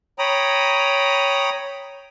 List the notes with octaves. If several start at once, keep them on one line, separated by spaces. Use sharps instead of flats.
C#5 G5 A#5 B5 D#6